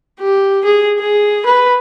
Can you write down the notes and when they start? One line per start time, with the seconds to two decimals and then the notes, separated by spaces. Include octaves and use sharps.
0.20 G4
0.65 G#4
0.99 G#4
1.46 B4